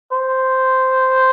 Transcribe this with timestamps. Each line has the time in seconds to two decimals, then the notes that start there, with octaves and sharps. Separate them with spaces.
0.13 C5